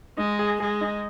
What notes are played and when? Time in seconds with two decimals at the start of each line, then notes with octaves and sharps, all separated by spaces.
0.17 G#3 D#4
0.39 G#4
0.60 G#3 G#4
0.81 D#4